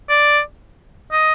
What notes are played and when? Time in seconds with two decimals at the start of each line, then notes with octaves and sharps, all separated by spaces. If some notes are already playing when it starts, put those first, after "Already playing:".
0.09 D5
1.12 D#5